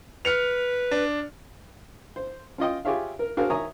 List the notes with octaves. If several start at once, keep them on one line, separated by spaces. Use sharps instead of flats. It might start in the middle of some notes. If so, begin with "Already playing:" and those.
B4 F6 C#7 F7
D4
C5
C#4 F4 D#5 G5
F4 G4 G#4 C#5 E5 F5
A#4
D4 F#4 G#4 A#4 C5 F5
D#3 C#5 E5 G#5 A#5 D#6